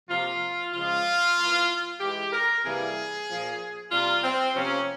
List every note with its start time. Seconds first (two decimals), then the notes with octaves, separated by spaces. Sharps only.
0.10 C3 F3 A#3 F4
0.74 C#3 F3 G#3 F4
1.37 E3 A#3
2.01 E3 G#3 G4
2.33 A#4
2.64 C3 E3 G3 A#3 G#4
3.28 A#2 F3 A#3
3.92 C3 G3 A#3 F4
4.24 C4
4.56 C3 F3 A#3 C#4